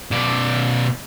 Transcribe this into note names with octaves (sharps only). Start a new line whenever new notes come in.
B2 D5